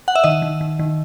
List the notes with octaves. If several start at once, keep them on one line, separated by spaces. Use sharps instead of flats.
F#5
E5
D#3 D#5
D#3
D#3
D#3